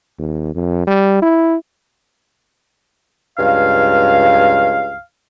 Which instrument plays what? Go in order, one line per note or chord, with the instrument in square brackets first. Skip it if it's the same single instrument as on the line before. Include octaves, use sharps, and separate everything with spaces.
[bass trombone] D#2
F2
G3
E4
[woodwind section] C#2 G2 F5